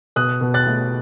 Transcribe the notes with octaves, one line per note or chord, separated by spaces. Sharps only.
B2 D#6 F#6
B2
F#6 A6
A3